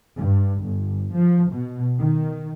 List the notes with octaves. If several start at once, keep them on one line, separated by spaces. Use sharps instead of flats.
G2
G1
F3
B2
D#3